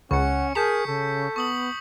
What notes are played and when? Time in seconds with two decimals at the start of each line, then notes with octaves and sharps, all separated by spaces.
0.11 C#2 C#3 C#4 F#5 C#6 C#7
0.55 G#4 A#4 A5 G6 B6 C#7
0.87 C#3 A4
1.36 B3 C#6 D#6 F#7